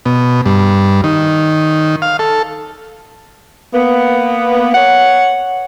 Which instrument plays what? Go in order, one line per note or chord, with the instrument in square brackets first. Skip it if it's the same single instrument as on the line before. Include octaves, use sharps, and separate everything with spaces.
[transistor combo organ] B2
G2
D#3
F5
A4
[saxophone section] A#3 B3
C#5 F#5